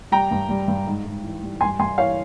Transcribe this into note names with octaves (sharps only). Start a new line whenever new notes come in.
G3 G5 A#5
G2
G3
G2
G#2
G#2
E3
G3
G2 G#5 C6
G2 G#5 C6
E3 C#5 F5